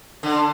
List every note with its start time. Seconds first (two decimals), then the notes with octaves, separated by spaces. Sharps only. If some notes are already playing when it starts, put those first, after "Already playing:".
0.23 D3